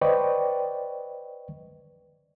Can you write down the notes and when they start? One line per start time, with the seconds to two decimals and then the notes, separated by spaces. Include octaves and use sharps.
0.01 B4 C5 D5 D#5 G5 C#6